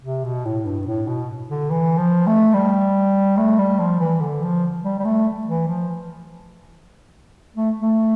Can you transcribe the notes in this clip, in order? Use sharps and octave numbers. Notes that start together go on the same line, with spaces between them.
C3
B2
A2
G2
A2
B2
D3
E3
F3
A3
G3
A3
G3
F3
E3
D3
F3
G3
G3
A3
E3
F3
A3
A3